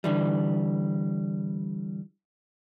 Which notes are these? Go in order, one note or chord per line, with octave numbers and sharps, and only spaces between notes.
D3 E3 G3